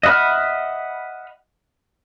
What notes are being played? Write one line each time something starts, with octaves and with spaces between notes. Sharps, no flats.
D#5 E5 F#5 B5 F6